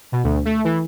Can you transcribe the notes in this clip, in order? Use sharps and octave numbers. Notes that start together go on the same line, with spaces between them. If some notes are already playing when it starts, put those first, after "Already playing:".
B2
D2
A3
E3